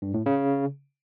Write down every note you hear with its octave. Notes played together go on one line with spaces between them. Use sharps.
G2
A2
C#3